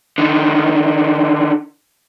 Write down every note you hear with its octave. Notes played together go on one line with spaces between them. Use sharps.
D3 D#3